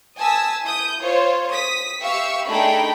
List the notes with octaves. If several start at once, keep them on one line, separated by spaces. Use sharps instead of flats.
G#5 A5 D#6 E6 B6
E4 D#6 G6
F4 C5 C#5
D#6 B6
G4 E5 F5 C#6 E6
A3 D4 D#4 G#4 G5 B5